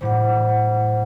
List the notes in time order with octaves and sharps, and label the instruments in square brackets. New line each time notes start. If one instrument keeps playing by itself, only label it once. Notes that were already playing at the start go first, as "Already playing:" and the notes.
[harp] A2 F#3 G3 [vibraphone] C5 F#5